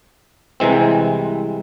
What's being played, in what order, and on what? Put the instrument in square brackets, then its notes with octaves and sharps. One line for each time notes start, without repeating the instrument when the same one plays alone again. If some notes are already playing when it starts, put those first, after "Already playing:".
[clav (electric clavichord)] C2 C3 E3 G#3 C4